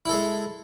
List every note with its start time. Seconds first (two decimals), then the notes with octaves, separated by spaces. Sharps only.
0.05 E4
0.09 A4
0.13 G#3